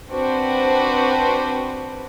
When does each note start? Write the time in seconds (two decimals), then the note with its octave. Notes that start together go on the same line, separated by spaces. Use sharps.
0.11 C4 D4 F#4 B4 C5